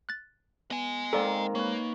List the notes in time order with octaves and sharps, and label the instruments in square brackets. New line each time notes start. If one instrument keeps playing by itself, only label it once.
[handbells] F#6 A6
[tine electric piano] B3 [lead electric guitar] D#5 G#5
[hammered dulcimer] D#3 A#3 C4 [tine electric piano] G#3 A#4 A#5 [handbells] A4 D5
[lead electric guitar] A#3 [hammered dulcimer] B4 C#5